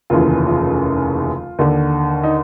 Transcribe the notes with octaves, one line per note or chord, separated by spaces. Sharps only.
F1 D#2 C#3 E3 F4
F4
D#2 D3
D#4